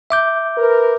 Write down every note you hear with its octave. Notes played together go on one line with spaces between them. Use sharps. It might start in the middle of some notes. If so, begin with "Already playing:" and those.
E5 D6 G6
A#4 B4